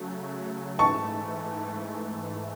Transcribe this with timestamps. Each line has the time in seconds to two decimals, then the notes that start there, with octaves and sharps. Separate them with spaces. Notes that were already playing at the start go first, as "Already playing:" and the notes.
Already playing: C#3 F#3 A3
0.79 G#2 E3 A3 A5 C#6